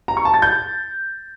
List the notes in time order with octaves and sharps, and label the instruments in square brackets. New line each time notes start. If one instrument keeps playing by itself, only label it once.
[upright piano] A#5
C#6
A5
A6
G6